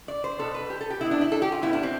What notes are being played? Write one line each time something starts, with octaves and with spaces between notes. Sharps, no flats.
D5
C5
B2 B3 A4
B4
G4
A4
G4
B2 B3 E4
D4
E4
A4
G4
F4
A2 G3 B3 E4
D4
C4